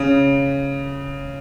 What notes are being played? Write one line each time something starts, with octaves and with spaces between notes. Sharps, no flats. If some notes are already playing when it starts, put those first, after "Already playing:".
Already playing: C#3